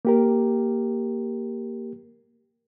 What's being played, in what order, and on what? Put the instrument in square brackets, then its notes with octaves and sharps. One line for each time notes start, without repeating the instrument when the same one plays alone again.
[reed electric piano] A#3 G4 A#4